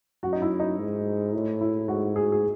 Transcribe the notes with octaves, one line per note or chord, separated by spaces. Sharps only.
F#2 F#4
D#4
E4
D#4
G#2
A2
E4
G#2 F#4
G#4
G#4